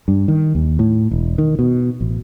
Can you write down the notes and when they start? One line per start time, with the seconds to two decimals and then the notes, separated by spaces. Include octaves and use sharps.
0.08 G2
0.28 D#3
0.55 D#2
0.79 A2
1.11 E1
1.38 D#3
1.59 B2
2.01 A1